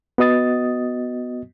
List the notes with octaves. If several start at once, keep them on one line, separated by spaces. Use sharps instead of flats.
B3 F#4 D#5 D#6 A6